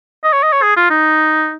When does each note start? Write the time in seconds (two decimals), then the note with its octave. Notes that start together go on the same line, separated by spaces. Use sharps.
0.24 D#5
0.33 C#5
0.43 D#5
0.53 C#5
0.63 G#4
0.76 F4
0.90 D#4